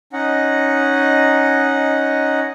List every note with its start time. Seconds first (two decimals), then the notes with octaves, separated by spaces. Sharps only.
0.13 C#4 D#4 D#5 F#5